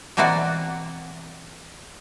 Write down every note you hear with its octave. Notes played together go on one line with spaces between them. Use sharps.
B2 E3 A#3 C4 F#4 D5